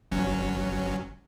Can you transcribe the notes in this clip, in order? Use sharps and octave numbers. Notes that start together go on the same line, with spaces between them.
G1 F#3 C#4